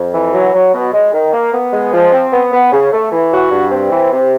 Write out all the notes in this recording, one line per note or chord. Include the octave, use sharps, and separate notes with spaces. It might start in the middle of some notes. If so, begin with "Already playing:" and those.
Already playing: F2
E3
F#3
F#3
B2
G#3
D#3
A#3
B3
G#3
F3
C4
B3
B3
C#3
A3
E3
F#4
G2
C4
E3
C3